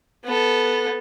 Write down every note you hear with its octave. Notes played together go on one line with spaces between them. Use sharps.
B3 A4